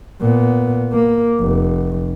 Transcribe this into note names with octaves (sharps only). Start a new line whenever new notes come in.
A#2 B3
A#3
F1